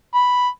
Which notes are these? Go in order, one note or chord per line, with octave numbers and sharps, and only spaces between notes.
B5